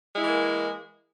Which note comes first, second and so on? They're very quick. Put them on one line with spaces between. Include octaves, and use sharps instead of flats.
G#3 E4 E3 A#3